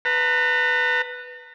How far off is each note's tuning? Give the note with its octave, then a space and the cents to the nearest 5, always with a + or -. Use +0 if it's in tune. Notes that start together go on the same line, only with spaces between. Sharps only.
B4 +0 A#5 -45